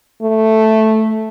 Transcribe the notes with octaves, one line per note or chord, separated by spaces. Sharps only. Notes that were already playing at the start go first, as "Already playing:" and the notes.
A3